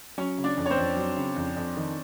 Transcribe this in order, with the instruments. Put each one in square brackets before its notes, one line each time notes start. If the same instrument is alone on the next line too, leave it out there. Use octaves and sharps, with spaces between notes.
[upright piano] F#3 [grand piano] C#4 C#5
[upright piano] C#3
[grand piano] D4 D5
[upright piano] F2
[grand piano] C#5
C4 C5
[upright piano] F2
F#3
C#3
F2
F2
D#3